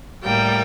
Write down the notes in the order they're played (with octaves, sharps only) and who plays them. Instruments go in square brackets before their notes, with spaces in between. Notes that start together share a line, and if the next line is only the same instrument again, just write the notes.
[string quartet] A2 G3 A#3 G5